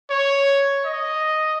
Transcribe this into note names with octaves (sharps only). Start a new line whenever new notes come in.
C#5
D#5